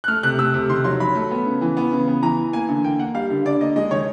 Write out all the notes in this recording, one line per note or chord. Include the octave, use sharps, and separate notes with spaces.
F#6
A3 F6
C3 F#6
A3 E6
C3
D#3 C6
F#3 C6
F#3 B5
A3
B3
C#3
E3
B3
C#3
B3
E3 A#5
E3
A#3 G#5
D3
A#3 G5
A#3 F#5
G3 F5
D3
D3 D5
A#3 D#5
G#3 D#5
D#3 C#5